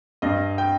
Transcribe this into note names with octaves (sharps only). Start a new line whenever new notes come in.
G2 D#5
G5